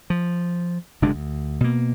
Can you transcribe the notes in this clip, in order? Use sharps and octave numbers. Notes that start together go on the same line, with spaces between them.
F3
F#1 C3 G#3 D4
D2
B2 A#3